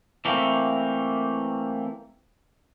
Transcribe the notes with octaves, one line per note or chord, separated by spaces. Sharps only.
E3 A3 A#3 C4